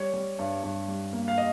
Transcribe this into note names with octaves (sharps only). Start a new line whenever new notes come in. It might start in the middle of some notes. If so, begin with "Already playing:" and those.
Already playing: G3 C#5
G3
G2
G2
G3
A#3
F5
D#5